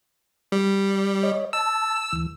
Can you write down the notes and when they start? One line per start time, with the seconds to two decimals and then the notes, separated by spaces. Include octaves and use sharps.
0.52 G3
1.23 C#5 D#5
1.53 A5 E6
2.13 D2 E3